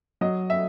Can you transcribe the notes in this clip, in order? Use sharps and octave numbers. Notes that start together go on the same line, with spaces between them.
F#3 D#5
E5